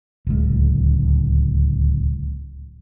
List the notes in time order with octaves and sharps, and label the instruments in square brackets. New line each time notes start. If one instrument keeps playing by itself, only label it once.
[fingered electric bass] D1 C#2